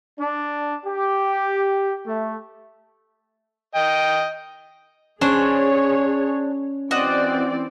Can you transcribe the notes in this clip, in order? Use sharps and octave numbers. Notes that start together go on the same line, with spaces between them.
D4
G4
A3
D#5 G5
C#4 D4 G#4 C5 C#5 C6
E3 C4 F#4 D5 D#5